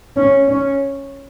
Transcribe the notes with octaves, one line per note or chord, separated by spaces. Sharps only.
C#4
C#4